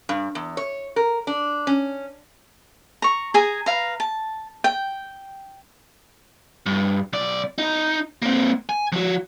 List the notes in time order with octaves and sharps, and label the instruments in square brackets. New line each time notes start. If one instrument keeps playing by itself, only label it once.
[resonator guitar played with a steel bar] G2
E2
C#5
A#4
D4
C#4
[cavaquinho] A#5 C#6
G#4 G#5 A#5
B4 F5 A#5
A5
G5
[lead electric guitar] G2
B1 D5
D#4
A#3 C4
G#5
F3 F#4